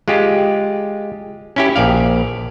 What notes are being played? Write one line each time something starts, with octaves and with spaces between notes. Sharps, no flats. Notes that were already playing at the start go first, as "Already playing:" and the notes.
G#3 F4 G4
C#4 E4 G4
A#1 D5 F5